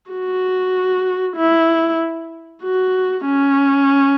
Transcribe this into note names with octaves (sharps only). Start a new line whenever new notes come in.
F#4
E4
F#4
C#4